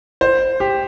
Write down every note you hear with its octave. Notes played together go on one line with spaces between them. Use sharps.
C5
G4